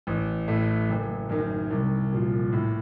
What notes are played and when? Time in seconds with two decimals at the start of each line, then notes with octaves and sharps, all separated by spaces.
0.07 A1
0.48 A2 A3
0.89 F#1
1.29 F#2 D#3
1.71 C2
2.12 A#2 F3
2.53 A2